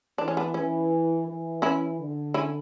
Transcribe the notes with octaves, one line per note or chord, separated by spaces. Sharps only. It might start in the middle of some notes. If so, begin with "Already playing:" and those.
E3 D4
C#4
B3 D4
E3 C#4 E4
E3
C#4 E4
D3
C#4 E4